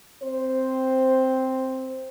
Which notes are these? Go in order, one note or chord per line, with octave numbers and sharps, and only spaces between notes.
C4 C5